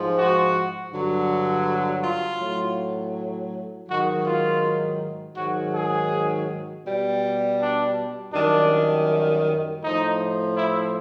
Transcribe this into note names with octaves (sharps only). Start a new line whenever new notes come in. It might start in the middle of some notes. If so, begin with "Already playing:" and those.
Already playing: G#2 F3
F#4
G2 D3 F#3
F4
A2 F#3
G#2 D#3 F#3 F#4
F4
G#2 D#3 F#3 F#4
G#4
B2 G3
D4
F#2 D#3 G3 D4
A2 F3 D#4
E4